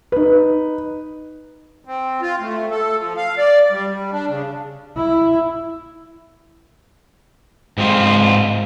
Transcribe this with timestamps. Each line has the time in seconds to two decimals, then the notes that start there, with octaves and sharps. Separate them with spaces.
0.12 D#4 B4
1.85 C4
2.22 F4
2.40 A3
2.71 A4
2.97 F3
3.17 F5
3.38 D5
3.71 G3
3.90 G3
4.12 D4
4.29 C#3
4.97 E4
7.78 G#2 C4 F4